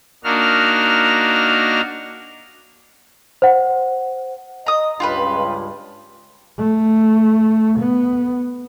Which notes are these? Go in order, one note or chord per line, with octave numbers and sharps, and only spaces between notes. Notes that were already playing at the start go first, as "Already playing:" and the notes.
A#3 D4 D#4 F#4 F6
C5 F#5
D#5 A#5 D#6
C#2 G2 F4 G4 B4
A3
B3